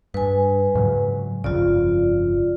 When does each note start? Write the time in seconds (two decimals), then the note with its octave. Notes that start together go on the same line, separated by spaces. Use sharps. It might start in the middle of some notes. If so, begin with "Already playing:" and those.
0.14 G2 B4 G#5
0.75 G#2 C#3 F#3
1.44 G1 F2 C#3 F4 D5